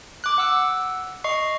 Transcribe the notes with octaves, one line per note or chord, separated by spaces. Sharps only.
D6 F#6
F#5 E6
D#5 C#6 C7